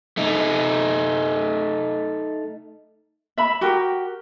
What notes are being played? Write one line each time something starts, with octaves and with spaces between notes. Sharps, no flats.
A3 D#4
E5 B5
F#4 G4 A#4